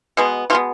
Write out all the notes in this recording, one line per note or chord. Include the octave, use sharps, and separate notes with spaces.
B2 G#3 B3
B2 G#3 B3 F4